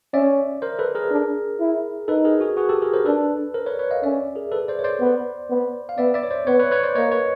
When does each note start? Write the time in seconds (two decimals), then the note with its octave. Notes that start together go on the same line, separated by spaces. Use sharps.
0.14 C#4 D5 E5
0.62 A#4 C5
0.79 A4 B4
0.95 G#4 A#4
1.11 D4
1.60 E4
2.08 D#4 A4 B4
2.25 G#4 A#4
2.41 F#4 G#4
2.57 F#4 G#4
2.69 G4 A4
2.82 G#4 A#4
2.93 A#4 C5
3.06 D4 A4 B4
3.54 A#4 C5
3.66 B4 C#5
3.74 D5
3.79 B4 C#5
3.91 D#5 F5
4.03 C#4 D5 E5
4.35 G#4 A#4
4.52 A4 B4
4.68 C5 D5
4.79 C#5
4.84 C5 D5
5.01 B3
5.50 B3
5.89 F5
5.98 B3 D5 E5
6.14 D5 E5
6.23 C#5
6.31 C5 D5
6.47 B3 B4 C#5
6.59 B4 C#5
6.71 B4 C#5
6.83 C5 D5
6.95 A#3 C#5 D#5
7.12 B4 C#5